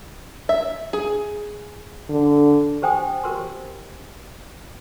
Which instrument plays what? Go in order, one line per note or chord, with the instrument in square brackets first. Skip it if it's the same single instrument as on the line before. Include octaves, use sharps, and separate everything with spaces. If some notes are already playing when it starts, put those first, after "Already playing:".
[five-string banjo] E5
G#4
[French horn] D3
[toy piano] G4 C5 G5 G#5 D#6
G4 A#4 C5 C6